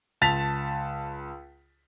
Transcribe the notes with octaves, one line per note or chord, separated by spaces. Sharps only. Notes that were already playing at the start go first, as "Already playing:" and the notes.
C#2 A5 A6 B6 F7